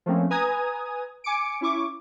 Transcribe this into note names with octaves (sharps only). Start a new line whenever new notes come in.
F3 A3 A#3 C4 C#4
B4 G#5 A#5 D#6 G#6
G#5 D6 C#7 D7
C#4 E4 C#6 D6